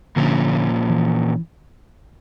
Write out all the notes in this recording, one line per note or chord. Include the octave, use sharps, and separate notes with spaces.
A#2 D3 F3 A#3 C#4
E3